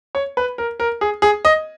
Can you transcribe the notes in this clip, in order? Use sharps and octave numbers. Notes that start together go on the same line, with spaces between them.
C#5
B4
A#4
A#4
G#4
G#4
D#5